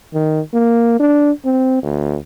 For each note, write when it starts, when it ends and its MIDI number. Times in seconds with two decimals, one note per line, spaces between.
0.14 0.40 51
0.54 0.98 58
1.00 1.31 62
1.45 1.82 60
1.83 2.17 38